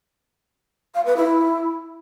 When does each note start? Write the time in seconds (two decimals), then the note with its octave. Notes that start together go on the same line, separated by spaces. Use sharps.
0.95 F5
1.06 B4
1.16 E4